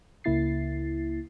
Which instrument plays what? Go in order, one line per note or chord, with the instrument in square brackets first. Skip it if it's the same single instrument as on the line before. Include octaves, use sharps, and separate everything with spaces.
[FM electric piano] C#2 C#3 A#3 E4 A6 C7